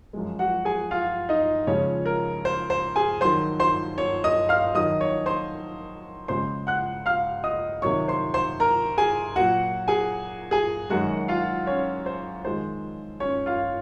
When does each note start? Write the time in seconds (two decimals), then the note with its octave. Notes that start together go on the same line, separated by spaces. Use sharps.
0.13 F#2 F3 G#3
0.39 F#4 F#5
0.65 G#4 G#5
0.91 F4 F5
1.29 D#4 D#5
1.67 F2 C#3 F3 G#3 C#4 C#5
2.06 A#4
2.45 C5
2.70 C5
2.96 G#4 G#5
3.21 F2 D#3 F#3 C5 C6
3.60 C5 C6
3.98 C#5 C#6
4.24 D#5 D#6
4.49 F5 F6
4.75 F2 D#3 F#3 D#5 D#6
5.00 C#5 C#6
5.26 C5 C6
6.28 F2 C#3 G#3 C5 C6
6.67 F#5 F#6
7.06 F5 F6
7.44 D#5 D#6
7.82 F2 C3 D#3 F#3 C#5 C#6
8.08 C5 C6
8.34 C5 C6
8.60 A#4 A#5
8.97 G#4 G#5
9.36 A#2 F#3 F#4 F#5
9.88 G#4 G#5
10.51 G#4 G#5
10.90 F#2 D#3 G#3 F#4 F#5
11.28 F4 F5
11.67 C#4 C#5
12.06 C5
12.44 F2 D#3 G#3 C5
13.20 C#4 C#5
13.46 F4 F5